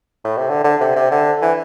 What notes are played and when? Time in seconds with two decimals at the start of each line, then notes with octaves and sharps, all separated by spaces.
0.24 A2
0.37 C3
0.49 D3
0.64 D3
0.81 C3
0.96 C3
1.11 D3
1.42 E3